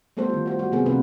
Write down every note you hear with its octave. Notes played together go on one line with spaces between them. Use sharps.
G3 A3 B3 A4 C5
D#3 F4
F#4 C5
G3 F#4
C3 F3 G#3 B3 G#4 A#4
C3 A#3 C4 D4 B4